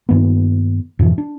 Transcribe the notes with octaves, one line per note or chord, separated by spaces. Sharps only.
G2 D#3 A#3 B3
F2 G#2 B2 E3
D4